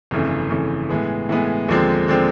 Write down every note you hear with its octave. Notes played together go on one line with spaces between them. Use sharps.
G1 F2 C#3 E3 A3
G1 F2 C#3 E3 A3
A2 E3 G#3 B3
A2 E3 G#3 B3
D#2 D3 F3 G#3 C4
D3 F3 G#3 C4